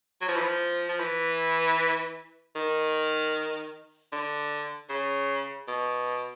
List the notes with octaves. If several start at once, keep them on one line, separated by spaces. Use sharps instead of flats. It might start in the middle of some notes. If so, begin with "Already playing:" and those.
F#3
F3
E3
F3
F3
E3
D#3
D3
C#3
B2